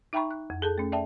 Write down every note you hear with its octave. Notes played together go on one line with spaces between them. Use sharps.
D#4 E5 G5 A#5 B5 C#6
F#6
F2
G#4 A4 A5
A3 C#4
D5 E5 G5 A5